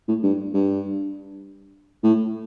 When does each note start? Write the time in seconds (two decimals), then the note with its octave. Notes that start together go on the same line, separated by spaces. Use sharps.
0.08 A2
0.23 G2
0.54 G2
2.04 A2